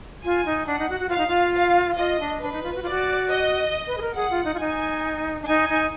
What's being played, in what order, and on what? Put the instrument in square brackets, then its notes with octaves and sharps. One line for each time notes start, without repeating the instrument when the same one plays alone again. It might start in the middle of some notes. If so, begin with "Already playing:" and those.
[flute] F4 [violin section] G#5
[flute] D#4
[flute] D4 [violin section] F#5
[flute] D#4
F#4
F#4
[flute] F4 [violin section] F5
[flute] D#4
F4
[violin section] F5
[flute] F4 [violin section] D#5
[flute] D4
[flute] D4 [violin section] B4
[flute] D#4
F4
F#4
F4
[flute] F#4 [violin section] D5
[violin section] D#5
[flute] B4
G#4
A#4
[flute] G#4 [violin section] F#5
[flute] F4
D#4
F4
[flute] D#4 [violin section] G#5
[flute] D4
[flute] D#4 [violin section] G#5
[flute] D#4